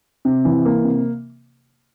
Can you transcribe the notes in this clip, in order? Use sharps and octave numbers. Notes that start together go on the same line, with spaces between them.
C3
E3
A#3
C3